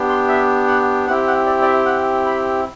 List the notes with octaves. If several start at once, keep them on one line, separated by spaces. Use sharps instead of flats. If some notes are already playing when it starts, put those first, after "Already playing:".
Already playing: B3 D4 G4
C6
E5
F#5
C4 E4 G4 F#5
F#5
D5
D5
E5
F#5
B5